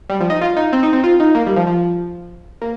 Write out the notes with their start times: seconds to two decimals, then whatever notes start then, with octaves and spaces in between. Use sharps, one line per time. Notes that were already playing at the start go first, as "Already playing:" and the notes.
0.10 G3
0.21 F3
0.30 D#4
0.41 F4
0.57 D#4
0.73 C4
0.83 D#4
0.93 C4
1.04 F4
1.20 D#4
1.35 A#3
1.46 G3
1.56 F3
1.67 F3
2.62 A#3